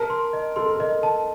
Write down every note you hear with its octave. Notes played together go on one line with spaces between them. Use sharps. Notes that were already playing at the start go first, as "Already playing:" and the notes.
Already playing: A#4 A5
C6
D#5
A4 C6
A#4
A4 D#5
A5